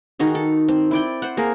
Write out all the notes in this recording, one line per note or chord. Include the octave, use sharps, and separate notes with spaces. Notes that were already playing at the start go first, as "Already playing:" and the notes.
D#3 D#4 F#4 G#4
A4
C4
E4 D5 G5
C5 F#5
A#3 G#4 A#4